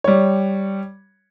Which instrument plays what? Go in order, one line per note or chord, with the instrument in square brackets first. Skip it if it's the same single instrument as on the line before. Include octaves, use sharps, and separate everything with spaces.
[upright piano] G3 C#5